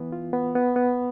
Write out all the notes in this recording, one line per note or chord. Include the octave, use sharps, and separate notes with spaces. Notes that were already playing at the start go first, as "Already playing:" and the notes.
Already playing: E3 B3
F4
B3
B3
B3